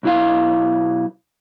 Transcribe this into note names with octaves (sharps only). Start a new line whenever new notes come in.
B1 E4 F5